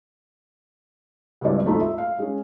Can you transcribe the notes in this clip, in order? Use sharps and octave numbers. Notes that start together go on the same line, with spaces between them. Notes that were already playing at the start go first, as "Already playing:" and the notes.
C#2 G2 C4 E4 D5
G#1 D#2 A3 D#4 F4 B5
E5
F5
G#3 C#4